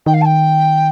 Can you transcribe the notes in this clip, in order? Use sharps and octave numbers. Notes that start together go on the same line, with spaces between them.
D#3 G5
F5
A5
G5